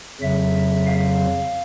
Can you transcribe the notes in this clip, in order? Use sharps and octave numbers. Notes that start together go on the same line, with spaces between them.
F2 C#3 F#3 E5
F5